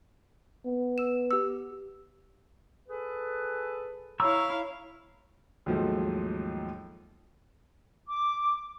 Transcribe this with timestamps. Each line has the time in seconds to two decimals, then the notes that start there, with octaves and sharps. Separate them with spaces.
0.66 B3
0.98 E6 E7
1.31 G4 E6
2.89 G#4 A4 B4
4.20 E4 C#5 F5 A#5 C#6 E6
5.66 D#2 G#2 F3 F#3 A3
8.07 D6